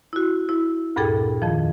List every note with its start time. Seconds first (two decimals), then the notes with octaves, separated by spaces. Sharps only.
0.13 E4 F#4
0.49 E4
0.96 D2 G2 A#2 G#4 A4 G5
1.42 F2 D#3 F3